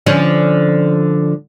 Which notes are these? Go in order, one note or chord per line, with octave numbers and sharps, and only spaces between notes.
D3 F3 C#4